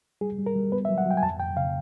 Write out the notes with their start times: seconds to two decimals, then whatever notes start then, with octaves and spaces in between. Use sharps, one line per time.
0.21 G3 G#4
0.39 G3
0.46 A#4
0.55 G3
0.72 B3 B4
0.85 E5
0.89 F#3
0.98 F#5
1.06 F#3 G5
1.17 G#5
1.22 F2 A5
1.40 F2 G5
1.56 C#3 F5